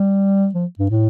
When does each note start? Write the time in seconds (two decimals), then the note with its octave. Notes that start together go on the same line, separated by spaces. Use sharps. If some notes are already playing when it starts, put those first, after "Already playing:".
Already playing: G3
0.55 F3
0.79 G2
0.91 A2